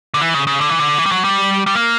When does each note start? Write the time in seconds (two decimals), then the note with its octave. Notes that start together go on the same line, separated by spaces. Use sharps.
0.14 D3
0.21 E3
0.34 C#3
0.47 C#3
0.61 D3
0.69 E3
0.79 D3
0.98 E3
1.06 G3
1.12 F#3
1.24 G3
1.66 G3
1.75 A#3